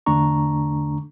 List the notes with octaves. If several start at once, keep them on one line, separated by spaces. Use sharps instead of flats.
E2 D3 A3 D4 A#5 C#6